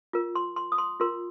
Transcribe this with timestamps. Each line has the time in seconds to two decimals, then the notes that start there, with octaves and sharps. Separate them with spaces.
0.13 F4 A#4
0.35 C6
0.56 C6
0.72 D#6
0.78 C6
1.00 F4 A#4 C6